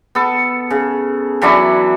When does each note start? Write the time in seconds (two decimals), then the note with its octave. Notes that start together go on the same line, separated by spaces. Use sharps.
0.15 B3 A4
0.70 C#3
1.42 E3 F#3 D4 E4